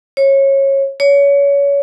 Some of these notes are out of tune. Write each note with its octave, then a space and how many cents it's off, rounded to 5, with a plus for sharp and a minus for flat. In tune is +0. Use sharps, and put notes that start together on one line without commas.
C#5 -20
C#5 +25